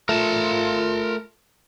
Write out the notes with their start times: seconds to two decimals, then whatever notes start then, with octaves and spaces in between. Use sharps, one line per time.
0.09 A3 F4 A#4 A5